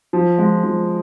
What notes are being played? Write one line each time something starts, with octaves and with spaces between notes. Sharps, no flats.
F3
G#3
F3